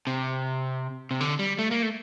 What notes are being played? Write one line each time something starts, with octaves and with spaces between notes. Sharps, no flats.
C3
C3
D3
G3
A3
A#3
A3